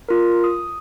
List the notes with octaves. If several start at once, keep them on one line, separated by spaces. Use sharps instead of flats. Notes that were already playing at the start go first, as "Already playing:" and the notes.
F4 A#4
D#6